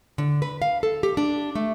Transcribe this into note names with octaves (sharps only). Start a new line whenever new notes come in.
D3
B4
F5
A4
G4
D4
A3